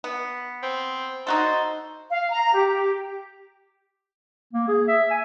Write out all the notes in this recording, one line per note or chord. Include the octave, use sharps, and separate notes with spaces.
B3
C4
D#4 F#4 A4 C5
F5
A#5
G4
A#3
G#4
E5
G#5